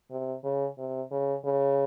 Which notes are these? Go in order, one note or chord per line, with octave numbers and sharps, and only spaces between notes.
C3
C#3
C3
C#3
C#3